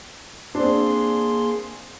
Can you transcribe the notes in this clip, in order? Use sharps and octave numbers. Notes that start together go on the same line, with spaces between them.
A#3 C4 D4 G#4 C6